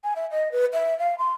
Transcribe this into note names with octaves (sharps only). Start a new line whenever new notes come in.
G#5
E5
D#5
B4
E5
F5
C6